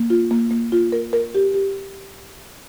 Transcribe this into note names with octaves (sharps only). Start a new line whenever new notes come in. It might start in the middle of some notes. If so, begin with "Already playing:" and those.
Already playing: A#3
F4
A#3
A#3
F4
A#4
A#4
G4
G4